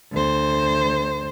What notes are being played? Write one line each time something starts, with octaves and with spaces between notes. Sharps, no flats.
D2 C5